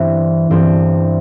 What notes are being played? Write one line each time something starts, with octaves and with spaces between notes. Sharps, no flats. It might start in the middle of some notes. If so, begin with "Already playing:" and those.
Already playing: G2 E3 C4
G2 E3 C4